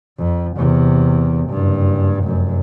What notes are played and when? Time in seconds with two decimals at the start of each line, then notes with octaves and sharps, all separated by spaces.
0.18 F2
0.57 E2 C3
1.50 F#1 G2
2.21 F1 F#2